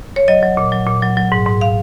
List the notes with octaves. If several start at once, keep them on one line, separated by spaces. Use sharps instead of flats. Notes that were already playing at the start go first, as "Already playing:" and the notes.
C#5
F#3 D#5
F#3
A#2
F#3
A#2
F#3
F#3
G#2
G#2
F5